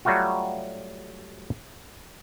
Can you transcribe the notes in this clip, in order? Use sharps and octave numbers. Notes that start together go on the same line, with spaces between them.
F#3 G3 A3 F4 F#4